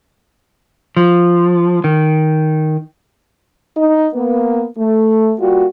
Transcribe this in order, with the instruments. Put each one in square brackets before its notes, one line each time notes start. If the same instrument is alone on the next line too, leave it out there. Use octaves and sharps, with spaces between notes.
[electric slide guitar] F3
D#3
[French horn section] D#4
A#3 B3
A3
G3 A#3 F4 F#4